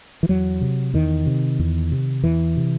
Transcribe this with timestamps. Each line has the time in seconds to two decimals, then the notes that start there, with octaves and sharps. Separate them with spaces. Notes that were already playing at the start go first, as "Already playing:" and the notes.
0.23 E3
0.29 E2 F#3
0.61 C3
0.94 E2 D#3
1.26 C3
1.59 E2
1.92 C3
2.24 E2 E3
2.57 C3